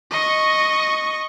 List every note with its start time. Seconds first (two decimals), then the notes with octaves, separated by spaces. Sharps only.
0.11 D#5 C#6